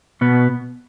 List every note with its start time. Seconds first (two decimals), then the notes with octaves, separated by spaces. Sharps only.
0.21 B2 B3